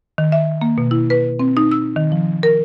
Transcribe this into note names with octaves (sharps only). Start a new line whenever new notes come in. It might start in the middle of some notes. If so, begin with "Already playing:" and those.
D#3
E5
A#3
B2
E4
B4
C4
D#4
E6
D#3
F3
A#4